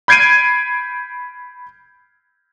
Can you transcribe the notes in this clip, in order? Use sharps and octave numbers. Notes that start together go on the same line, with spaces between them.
B5 G6 G#6 C7 D7 D#7